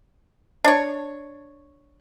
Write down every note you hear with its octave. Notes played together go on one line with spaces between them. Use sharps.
D4 C#5